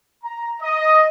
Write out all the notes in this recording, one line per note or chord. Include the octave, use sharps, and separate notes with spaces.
A#5
D#5